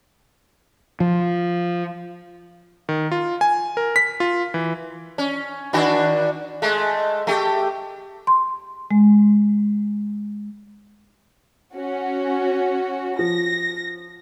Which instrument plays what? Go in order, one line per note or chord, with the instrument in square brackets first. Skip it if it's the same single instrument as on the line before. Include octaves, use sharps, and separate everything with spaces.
[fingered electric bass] F3
[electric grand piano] D#3
F4
G#5
A#4
B6
F4
E3
[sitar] C#4
D#3 D4 F#4
G#3 A3
A3 G4
[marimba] C6
G#3
[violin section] C#4 F#4
[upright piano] F3 [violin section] A#6